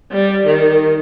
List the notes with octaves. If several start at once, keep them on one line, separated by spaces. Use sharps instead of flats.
G3
D#3